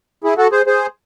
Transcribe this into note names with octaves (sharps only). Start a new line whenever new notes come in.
E4 G#4
F#4 A4
G#4 C5
G#4 C5